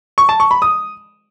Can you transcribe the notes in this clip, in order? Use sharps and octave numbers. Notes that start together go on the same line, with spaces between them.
C#6
A5
C#6
B5
D#6